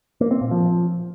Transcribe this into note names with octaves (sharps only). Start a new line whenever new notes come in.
A#3
C4
A#2
F3